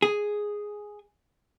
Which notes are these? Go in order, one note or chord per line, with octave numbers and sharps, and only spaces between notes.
G#4